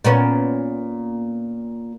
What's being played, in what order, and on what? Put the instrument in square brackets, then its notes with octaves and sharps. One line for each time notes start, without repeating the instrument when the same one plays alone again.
[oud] A#2 B3 C#4